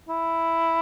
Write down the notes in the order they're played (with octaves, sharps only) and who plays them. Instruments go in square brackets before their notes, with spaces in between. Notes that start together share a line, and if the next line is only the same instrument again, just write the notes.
[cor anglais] E4